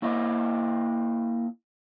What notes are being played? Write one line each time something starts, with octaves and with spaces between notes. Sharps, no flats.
A#3 E4 D#5